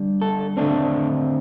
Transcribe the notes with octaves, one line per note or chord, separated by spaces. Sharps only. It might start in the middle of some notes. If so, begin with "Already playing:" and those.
Already playing: D3 G3 D4
A4
D3 A3 C4 D4